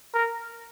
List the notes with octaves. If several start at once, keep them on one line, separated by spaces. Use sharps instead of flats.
A#4